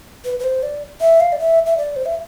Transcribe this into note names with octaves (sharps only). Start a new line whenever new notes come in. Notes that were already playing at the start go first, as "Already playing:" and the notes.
B4
B4
C5
D5
E5
F5
D5
E5
E5
D5
C5
E5